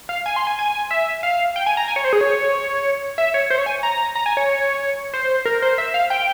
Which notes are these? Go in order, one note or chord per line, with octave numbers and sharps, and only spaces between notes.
F5
G#5
C6
G#5
G#5
E5
F5
G5
G#5
A#5
G#5
C#5
C5
G#4
C#5
E5
C#5
C5
C#5
G#5
A#5
A#5
G#5
C#5
C5
A#4
C5
E5
F5
G5